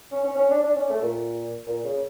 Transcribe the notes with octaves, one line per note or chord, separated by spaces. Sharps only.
C#4
C#4
C#4
D4
D4
C#4
A3
A#2
A#2
C#3